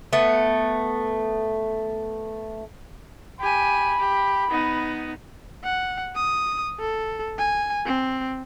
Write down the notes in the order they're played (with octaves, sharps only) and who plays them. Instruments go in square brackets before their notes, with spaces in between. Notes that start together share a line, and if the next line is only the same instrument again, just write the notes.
[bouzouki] A3 B3
[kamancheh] G4 G#5 [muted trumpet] B5
[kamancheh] G4
B3 D#4
[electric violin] F#5
D#6
A4
G#5
C4